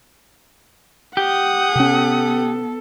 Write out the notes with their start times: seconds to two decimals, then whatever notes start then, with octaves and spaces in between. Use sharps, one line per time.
1.17 G4 F#5 D#6
1.75 C3 B3 C#4 A4